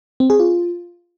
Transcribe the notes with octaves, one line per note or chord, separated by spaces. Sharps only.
C4
G#4
F4